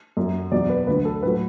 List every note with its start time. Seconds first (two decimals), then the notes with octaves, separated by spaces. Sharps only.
0.17 F#2 F#3
0.52 E2 B2 F#3 D5
0.69 B4
0.87 D2 D3 F#3 B4
1.05 A4
1.23 A2 F#3 B4